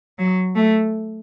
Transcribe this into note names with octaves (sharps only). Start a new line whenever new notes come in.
F#3
A3